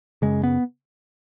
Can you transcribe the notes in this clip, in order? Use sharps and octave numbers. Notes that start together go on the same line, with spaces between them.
F#2 C#3 G#3
B3